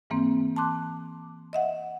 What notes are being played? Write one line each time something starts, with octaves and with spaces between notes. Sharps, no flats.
G#2 E3 A#3 C4
A5 C6 D6 F#6
D#5 E5 F#5